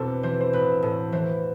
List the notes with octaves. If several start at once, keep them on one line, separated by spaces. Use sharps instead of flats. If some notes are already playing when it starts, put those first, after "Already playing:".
Already playing: E2 B2 C4 D4 A4
E3 C5
C5
A1 B4
A2 A4
E3 C5